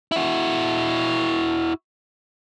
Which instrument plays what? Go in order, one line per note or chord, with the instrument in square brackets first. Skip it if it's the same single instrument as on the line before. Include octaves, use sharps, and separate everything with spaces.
[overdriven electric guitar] E4 F#4